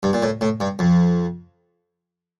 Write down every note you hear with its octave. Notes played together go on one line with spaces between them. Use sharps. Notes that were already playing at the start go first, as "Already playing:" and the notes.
G2
A#2
A2
A2
G2
F2